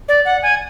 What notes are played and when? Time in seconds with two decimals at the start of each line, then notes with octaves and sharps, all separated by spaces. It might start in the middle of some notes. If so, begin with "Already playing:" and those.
0.08 D5
0.25 F#5
0.43 G#5